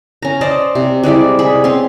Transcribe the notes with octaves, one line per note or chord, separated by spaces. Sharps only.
C#4 A#5
C5 D5 D#5 A5
C3
G3 G#3 E4 D5
G#4 B5
C4 C#4 C6